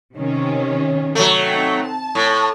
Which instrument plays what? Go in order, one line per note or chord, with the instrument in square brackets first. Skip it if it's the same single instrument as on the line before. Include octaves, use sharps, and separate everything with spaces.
[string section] C3 D#3 C#4
[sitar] F#3 A3
[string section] C4 D#4 G5
A5
[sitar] A2